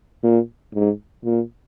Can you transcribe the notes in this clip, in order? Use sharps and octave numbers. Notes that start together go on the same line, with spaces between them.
A#2
G#2
A#2